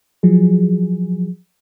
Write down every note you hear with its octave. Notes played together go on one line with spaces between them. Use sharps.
F3 F#3 G#4